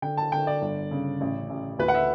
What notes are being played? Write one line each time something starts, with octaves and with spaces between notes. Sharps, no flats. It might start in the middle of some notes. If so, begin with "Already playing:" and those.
D3 G5
A5
D3 G5
D5
G1
C#3
A1
A1
D2 B4
F#5
E5